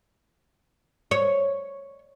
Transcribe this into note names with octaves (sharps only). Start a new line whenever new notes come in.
C#5